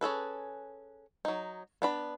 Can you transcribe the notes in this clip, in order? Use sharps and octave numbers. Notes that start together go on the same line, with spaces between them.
C#4 G#4 A4 B4
F#3 D#4
B3 D4 B5